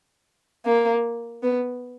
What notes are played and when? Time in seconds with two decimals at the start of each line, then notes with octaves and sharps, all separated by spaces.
0.66 A#3
1.43 B3